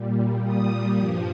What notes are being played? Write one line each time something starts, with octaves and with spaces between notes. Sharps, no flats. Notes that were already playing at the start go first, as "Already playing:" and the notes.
Already playing: A#2 G3
D#6
G2 F3